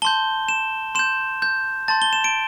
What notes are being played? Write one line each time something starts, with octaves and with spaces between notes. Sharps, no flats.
A5 C6 G6 G7
E7
C6 G6 E7
G6
A5 C6 G6 A6
G7
E7
D7